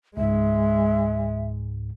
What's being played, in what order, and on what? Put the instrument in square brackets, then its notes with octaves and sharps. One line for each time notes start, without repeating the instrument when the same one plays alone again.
[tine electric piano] C#2 G#2 [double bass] G#3 [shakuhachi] E5